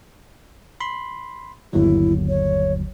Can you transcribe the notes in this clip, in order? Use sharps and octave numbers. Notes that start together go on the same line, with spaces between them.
B5 C6
G1 D#2 F#3 E4
C#5